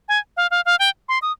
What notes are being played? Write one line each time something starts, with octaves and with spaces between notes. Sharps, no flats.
G#5
F5
F5
F5
G5
C6
D#6